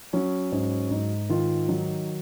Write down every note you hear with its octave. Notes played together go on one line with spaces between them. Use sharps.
F#3 C#4
G#2 C#4
G#2 D#4
D#3 F4
F#3 D#4